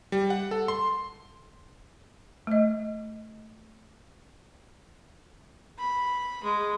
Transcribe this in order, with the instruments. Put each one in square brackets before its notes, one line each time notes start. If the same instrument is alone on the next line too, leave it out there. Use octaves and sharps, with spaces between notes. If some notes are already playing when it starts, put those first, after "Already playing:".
[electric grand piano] G3
F#5
A4
C6
[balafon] A3 D#5
[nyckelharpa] B5
G#3